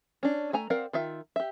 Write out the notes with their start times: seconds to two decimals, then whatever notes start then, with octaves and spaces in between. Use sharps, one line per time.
0.23 C#4 D4
0.53 A3 G#5 A#5
0.70 C4 A#4 D5 F5 F#5
0.93 D#3 F4 E5
1.36 G4 E5